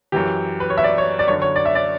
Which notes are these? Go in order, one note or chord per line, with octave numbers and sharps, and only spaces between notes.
F#2 E3 G4
B4
C#5
E5
D5
C#5
D5
F#2 D3 C#5
C#5
D5
E5
D5